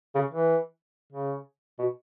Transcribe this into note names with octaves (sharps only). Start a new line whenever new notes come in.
C#3
E3
C#3
B2